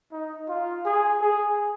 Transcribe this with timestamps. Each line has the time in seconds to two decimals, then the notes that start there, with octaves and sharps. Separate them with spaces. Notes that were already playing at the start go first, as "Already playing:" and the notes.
0.12 D#4
0.49 F4
0.85 G#4
1.21 G#4